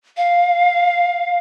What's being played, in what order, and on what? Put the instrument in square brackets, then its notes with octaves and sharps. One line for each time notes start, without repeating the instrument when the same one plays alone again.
[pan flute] F5